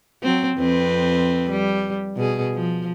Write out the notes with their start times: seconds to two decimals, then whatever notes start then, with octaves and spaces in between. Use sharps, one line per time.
0.23 F#3 C4
0.57 F2 C4 B4
1.50 G3
2.16 B2 G#4
2.54 F3